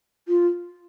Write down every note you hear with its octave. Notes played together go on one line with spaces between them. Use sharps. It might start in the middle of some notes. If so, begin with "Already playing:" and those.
F4